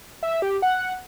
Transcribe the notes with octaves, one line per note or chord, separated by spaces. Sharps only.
E5
G4
F#5